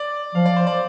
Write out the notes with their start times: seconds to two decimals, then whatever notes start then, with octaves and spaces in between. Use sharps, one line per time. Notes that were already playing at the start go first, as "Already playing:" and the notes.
Already playing: D5
0.35 F3 F5
0.46 D5
0.56 C5
0.67 D5